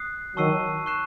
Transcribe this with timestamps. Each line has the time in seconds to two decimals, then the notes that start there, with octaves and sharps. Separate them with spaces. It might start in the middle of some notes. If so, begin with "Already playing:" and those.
Already playing: D#6 F#6 C7
0.36 D#3 F#3 A5 C#6 E6 C7 D#7
0.86 C#6 F#6 C7 E7